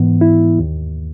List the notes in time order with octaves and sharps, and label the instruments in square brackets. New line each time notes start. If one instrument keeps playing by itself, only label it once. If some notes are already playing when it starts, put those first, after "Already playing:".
Already playing: [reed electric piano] G#2 E3 B3
E4
D#2